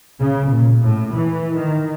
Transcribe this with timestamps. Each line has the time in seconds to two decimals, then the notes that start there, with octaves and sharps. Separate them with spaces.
0.19 C#3
0.50 A#2
0.81 A2
1.13 E3
1.54 D#3